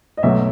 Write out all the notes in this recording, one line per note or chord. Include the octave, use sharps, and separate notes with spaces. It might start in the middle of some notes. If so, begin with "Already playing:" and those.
D#5
B1 B2 F#3 A3 E5